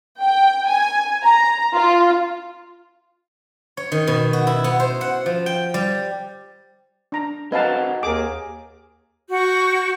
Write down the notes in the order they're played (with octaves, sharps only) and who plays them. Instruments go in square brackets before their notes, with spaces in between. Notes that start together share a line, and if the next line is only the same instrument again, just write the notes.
[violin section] G5
G#5
A#5
F4
[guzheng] C#5
D#3
B2
F#4
E4
B3
C5
F#5
F3
G5
G3
[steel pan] D4 A#5
[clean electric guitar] C4 F#4 A#4 [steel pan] B4 F5 A5 [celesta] D#5
[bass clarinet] D#2 [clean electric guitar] G#4 [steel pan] A#4 D6
[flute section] F#4 C#6 G6